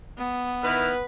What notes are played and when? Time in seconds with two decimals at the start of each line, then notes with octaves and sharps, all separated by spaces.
0.18 B3
0.64 D#3 E4 B4 F6